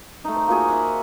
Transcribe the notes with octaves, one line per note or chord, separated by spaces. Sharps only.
A3 D#4
C5
A#3 F4 F#4 G#4
E5 F#5